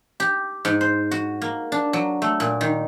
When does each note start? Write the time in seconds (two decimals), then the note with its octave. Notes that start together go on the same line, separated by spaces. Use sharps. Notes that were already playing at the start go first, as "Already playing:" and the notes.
0.20 G4
0.65 G#2
0.81 C5
1.11 F#4
1.42 A#3
1.72 D4
1.93 F#3
2.22 A3
2.40 A#2
2.61 D#3